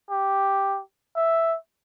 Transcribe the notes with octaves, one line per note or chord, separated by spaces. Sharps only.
G4
E5